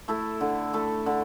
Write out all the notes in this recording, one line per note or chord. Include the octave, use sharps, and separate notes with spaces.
A3 E4 A4
D3
A3 E4 A4
D3